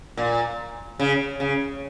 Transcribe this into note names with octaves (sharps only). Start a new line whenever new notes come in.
A#2
C#3
C#3